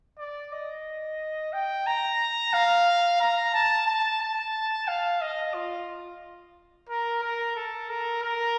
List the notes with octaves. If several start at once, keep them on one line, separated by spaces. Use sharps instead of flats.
D5
D#5
G5
A#5
F5
A#5
A5
A5
A5
F5
D#5
F4
A#4
A#4
A4
A#4
A#4